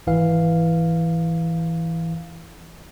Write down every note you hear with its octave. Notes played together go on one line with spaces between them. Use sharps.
G#1 E3 F5